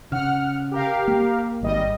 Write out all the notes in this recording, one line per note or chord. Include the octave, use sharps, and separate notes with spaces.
C#3 F#5 F6
G4 A#4 F5
A#3
G#1 G3 D#5